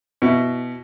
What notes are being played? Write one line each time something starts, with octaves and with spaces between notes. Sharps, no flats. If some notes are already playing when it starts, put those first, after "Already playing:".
B2 E4